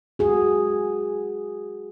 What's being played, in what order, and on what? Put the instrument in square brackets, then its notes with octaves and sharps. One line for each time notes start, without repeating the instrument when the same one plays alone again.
[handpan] F#4 G#4